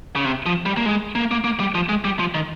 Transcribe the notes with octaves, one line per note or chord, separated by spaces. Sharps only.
C#3
C3
F3
G3
A#3
G#3
A#3
A#3
A#3
G3
F3
G#3
G3
F3
D#3